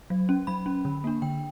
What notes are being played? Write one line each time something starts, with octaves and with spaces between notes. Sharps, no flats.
F#3
C#4
F#3 B5
C#4
D3
A#3 D4
D3 G5